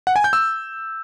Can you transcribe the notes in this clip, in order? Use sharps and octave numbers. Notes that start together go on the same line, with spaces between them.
F#5
G#5
G6
E6